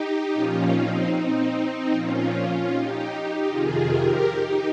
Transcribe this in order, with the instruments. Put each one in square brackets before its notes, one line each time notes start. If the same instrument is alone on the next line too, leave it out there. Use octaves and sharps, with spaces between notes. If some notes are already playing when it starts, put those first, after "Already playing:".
Already playing: [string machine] D#4 G4
A#2 F3 C#4 F4
C4 D#4
C4 D#4
A#2 F3 C#4 F4
D#4 G4
F2 C3 D#3 F4 G#4
G4 A#4
D#4 G4